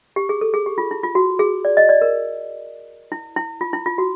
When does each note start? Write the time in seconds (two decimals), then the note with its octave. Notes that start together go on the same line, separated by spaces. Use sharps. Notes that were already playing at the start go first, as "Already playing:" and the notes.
0.16 G4
0.29 G#4
0.41 A4
0.54 G#4
0.66 G4
0.78 F4
0.91 E4
1.03 F4
1.15 F#4
1.39 G#4
1.65 D5
1.77 D#5
1.89 D5
2.02 A#4
3.12 E4
3.36 E4
3.61 F4
3.73 E4
3.86 F4
3.98 F#4